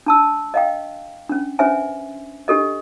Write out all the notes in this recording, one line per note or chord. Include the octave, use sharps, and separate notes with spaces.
D4 A5 E6
D#5 F5 G5
C#4 D4
C#4 D4 B4 C5 E5 G#5
D4 G4 A4 D#5